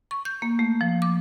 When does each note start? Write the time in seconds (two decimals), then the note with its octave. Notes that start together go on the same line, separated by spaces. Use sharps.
0.11 C#6
0.25 G6
0.42 A#3
0.59 A3
0.81 F3
1.02 D6